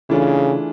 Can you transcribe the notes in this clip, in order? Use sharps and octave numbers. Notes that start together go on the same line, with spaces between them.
C#3 E3 A3 D4 F4 G#4